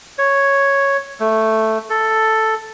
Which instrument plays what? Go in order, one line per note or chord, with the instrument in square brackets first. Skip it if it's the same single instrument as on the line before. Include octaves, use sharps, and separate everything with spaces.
[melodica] C#5
A3
A4